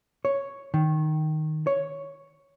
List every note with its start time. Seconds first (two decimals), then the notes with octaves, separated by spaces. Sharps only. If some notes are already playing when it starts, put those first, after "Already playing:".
0.25 C#5
0.74 D#3
1.67 C#5